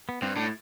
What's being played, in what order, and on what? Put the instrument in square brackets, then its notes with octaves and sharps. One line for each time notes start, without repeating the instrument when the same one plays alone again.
[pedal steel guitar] B3
[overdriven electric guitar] G2 [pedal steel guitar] C4
[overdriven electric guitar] A2 [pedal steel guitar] D4